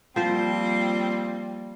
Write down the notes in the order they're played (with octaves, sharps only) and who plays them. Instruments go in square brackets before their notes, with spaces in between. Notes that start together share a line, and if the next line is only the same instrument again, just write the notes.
[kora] F3 C5 [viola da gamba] G3 A#3 F4 [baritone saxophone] C4